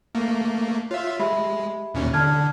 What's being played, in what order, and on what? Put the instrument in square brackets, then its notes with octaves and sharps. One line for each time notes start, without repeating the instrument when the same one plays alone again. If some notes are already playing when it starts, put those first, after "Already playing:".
[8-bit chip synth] A3 A#3
[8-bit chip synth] F4 E5 [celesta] C#5 F5
[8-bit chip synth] G#3 [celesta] G4 E5 B5
[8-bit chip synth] D#2 A#2 C#4
[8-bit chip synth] D3 [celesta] A5 F6 G#6